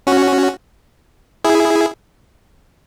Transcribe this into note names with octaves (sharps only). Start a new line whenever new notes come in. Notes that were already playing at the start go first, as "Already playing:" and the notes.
C#4 F#4
E4 G#4